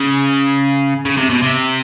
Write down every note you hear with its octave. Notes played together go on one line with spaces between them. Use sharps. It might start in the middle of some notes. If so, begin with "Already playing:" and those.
Already playing: C#3
C#3
C3
B2
C3